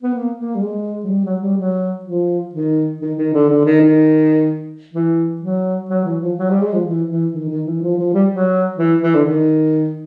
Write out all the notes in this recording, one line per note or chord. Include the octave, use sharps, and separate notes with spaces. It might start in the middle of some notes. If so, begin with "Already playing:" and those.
B3
A#3
A#3
G3
G#3
F#3
G3
F#3
G3
F#3
F3
D#3
D#3
D#3
D3
D3
D#3
D#3
E3
F#3
F#3
E3
F3
F#3
G3
G#3
F3
E3
E3
D#3
D#3
E3
F3
F3
G3
F#3
E3
E3
D3
D#3